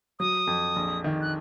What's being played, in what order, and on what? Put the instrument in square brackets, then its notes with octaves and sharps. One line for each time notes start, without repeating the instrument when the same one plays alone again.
[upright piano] F#3 [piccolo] D#6
[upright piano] F2
A#1
D#3
[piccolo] F#6